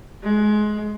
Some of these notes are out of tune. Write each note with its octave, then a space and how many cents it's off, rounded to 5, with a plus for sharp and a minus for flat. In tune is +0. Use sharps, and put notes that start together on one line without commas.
G#3 +20